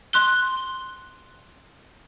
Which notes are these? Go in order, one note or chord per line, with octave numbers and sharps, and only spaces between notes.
C6 F#6 G7